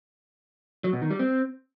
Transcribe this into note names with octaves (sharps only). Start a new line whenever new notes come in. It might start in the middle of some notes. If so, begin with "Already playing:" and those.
F#3
B2
D#3
G3
C4